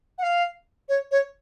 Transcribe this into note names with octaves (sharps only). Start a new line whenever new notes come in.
F#5
F5
C#5
C#5